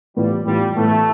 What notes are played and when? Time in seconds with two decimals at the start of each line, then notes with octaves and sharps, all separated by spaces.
0.16 A2 E3 G3 B3 F4
0.46 A2 E3 G3 B3 F4
0.76 A2 E3 A3 B3